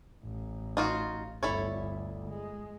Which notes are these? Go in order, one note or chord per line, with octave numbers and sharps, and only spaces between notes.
A1
D#4 F4 F#4
G1 D2 E4 A4 C#5
G#3